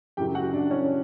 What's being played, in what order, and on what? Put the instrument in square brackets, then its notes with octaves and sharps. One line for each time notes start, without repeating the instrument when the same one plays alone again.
[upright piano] F#2 C#3 F#3 G4 G5
F#4 F#5
D4 D5
C#4 C#5